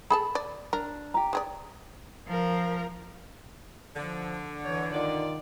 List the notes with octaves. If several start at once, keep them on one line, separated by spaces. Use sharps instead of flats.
G#4 A4 A5 B5
D5
D4 A#4
G4 A#5
G#3 G#4 D5
F3 A#4
D3 F3
E3 C#5
D#3 F4 D5